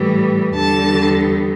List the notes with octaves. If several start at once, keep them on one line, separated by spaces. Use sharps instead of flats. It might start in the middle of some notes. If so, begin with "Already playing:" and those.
Already playing: A2 E3 G3
E2 D3 G3 A5